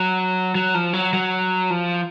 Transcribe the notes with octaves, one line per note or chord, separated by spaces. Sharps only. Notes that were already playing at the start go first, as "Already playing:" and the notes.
Already playing: F#3
F#3
F3
F#3
F#3
F3